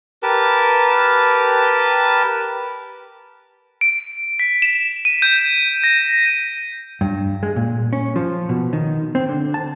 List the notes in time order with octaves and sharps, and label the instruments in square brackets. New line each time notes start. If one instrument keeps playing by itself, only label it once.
[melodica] G4 A#4 B4 A5
[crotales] D7
B6
E7
D#7
G6
A#6
[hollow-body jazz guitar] G2
G#3
A#2
C#4
F3
B2
D#3
C4
D3
A5